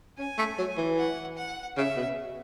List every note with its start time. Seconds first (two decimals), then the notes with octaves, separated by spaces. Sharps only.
0.18 C#4 G#5
0.38 A3
0.58 F#3
0.77 E3
0.98 F#5
1.37 F#5
1.77 C#3 E5
1.96 B2